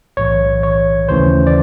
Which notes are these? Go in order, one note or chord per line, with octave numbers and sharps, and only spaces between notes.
B1 A2 E3 C#5
C#5
D#2 C#3 E3 A3 C#4 C5
D5